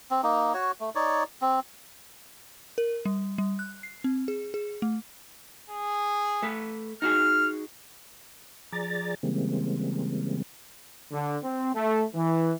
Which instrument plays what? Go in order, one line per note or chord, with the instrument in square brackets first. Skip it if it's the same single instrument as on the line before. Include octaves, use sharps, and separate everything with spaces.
[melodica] C4
A#3 D#4
F#4 C#5
A3
D#4 C#5 D5
C4
[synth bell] A#4
G3
G3
F#6
C7
C4
G#4
G#4
A3
[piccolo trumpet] G#4
[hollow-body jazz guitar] A3 B4
[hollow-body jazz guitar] D#4 F#4 G#4 [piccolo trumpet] F6
[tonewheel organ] F3 G#4 D5 A#5 A6
C#3 E3 G3 G#3 A#3 C4
[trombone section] D3
C4
A3
E3